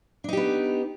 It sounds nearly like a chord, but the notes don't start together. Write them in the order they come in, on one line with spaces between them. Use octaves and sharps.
D4 D#4 G4 B3